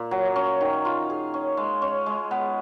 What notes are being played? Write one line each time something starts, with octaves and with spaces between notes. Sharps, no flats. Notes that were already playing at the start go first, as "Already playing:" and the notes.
Already playing: A#2
F#3
C#4
D#3
F4
G#4
C#4
G#3
C#4
G#3
B3